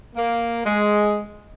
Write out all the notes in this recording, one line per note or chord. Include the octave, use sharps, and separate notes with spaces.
A#3
G#3